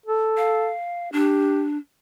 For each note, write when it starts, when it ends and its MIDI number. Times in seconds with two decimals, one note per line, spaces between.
0.06 0.72 69
0.37 1.11 77
1.12 1.78 62
1.12 1.65 67